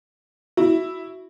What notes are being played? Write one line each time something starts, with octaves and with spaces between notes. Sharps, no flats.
E4 F#4